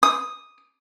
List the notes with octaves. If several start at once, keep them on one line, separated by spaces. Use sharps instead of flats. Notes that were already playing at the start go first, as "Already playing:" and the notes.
D#6